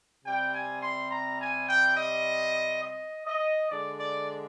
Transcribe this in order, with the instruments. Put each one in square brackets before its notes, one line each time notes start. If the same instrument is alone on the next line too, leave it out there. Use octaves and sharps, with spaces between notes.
[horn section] C3 G3 C4 G5
G#5
C6
A#5
G#5
G5
D#5
D#5
D#5
D3 G#3 D4 D5
D5